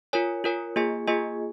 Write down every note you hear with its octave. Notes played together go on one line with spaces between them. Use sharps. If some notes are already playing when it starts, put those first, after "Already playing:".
F4 A#4 C#5 G#5
F4 A#4 C#5 G#5
A#3 F4 G#4 D#5 G#5
A#3 F4 G#4 D#5 G#5